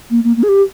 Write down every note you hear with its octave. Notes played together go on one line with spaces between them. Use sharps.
A#3
A#3
A#3
G#4
G4